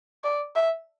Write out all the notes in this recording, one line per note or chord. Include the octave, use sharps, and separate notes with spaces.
D5
E5